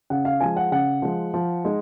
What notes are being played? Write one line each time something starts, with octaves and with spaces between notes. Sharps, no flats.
C#3 F#5
F5
F3 G#3 G#5
F#5
C#3 F#5
F3 G#3
F3
G#3 D#4